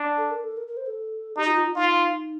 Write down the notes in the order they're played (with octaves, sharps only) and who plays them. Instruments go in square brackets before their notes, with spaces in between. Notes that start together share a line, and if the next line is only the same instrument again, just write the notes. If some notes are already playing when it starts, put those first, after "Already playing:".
Already playing: [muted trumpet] D4
[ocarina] A4
A#4
A4
A#4
A#4
C5
A4
[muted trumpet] D#4 [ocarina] G4
[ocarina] F4
F4
[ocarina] D#4 [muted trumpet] F4